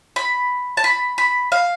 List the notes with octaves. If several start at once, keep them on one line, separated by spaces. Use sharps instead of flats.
B5
A5
B5
B5
F5